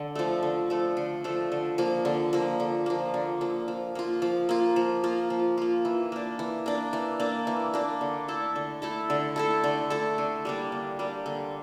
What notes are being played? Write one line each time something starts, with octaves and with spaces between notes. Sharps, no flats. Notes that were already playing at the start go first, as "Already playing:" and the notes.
Already playing: D3
F3 A3
D3
F3 A3
D3
F3 A3
D3
F3 A#3
D3
F3 A#3
D3
F3 A#3
D3
F3 A#3
F3
A#3 F4
F3
A#3 F4
F3
A#3 F4
F3
A#3 F4
E3
A#3 D4
E3
A#3 D4
E3
A#3 D4
E3
A#3 D4
D3
A3 E4 A4
D3
A3 E4 A4
D3
A3 E4 A4
D3
A3 E4 A4
D3
G3 A#3 D4
D3
G3 A#3 D4
D3